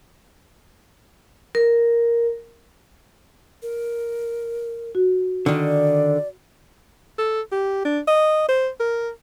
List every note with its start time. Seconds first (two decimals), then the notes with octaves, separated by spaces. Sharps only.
1.55 A#4
3.62 A#4
4.95 F#4
5.46 D3 D#3 D5
7.18 A4
7.52 G4
7.85 D4
8.07 D#5
8.49 C5
8.80 A#4